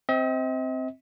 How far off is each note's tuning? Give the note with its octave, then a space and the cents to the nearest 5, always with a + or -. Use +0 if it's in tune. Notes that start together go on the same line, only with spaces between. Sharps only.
C4 +0 D#5 +45